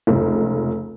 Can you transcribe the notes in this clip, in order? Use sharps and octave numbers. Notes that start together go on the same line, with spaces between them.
F1 C#2